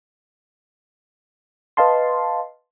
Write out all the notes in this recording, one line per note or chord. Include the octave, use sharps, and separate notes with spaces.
B4 D#5 F5 A5 C6